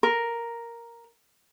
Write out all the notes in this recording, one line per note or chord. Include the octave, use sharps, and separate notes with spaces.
A#4